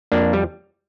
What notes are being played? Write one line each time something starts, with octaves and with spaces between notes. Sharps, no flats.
F2 A#3 D4
G3